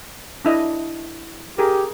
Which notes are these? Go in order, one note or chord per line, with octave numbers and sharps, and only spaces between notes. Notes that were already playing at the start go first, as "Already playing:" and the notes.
D4 E4 D#5
G4 G#4 A#4